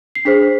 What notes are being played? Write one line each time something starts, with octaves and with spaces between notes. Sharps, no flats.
C7
D4 G#4 C5 B6